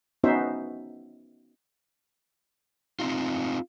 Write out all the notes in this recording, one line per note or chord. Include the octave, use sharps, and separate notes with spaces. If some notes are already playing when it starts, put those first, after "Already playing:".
B3 C#4 D#4 F#4 C5 E5
C4 D#4 F4